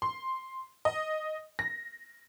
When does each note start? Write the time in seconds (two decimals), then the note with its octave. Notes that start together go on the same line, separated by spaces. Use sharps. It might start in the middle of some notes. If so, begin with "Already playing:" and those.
0.02 C6
0.85 D#5
1.59 A#6